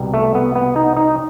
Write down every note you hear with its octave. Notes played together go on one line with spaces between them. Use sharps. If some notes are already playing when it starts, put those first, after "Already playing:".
Already playing: C2 B2 G3
A3
B3
B3
D#4
D#4